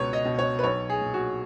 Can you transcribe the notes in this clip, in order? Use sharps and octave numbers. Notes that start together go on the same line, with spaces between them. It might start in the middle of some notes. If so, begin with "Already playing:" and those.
Already playing: C#2 B2 B4 C#5
D#5
B2
C#5
B4
B1 C#5
G#4
A#2
F#4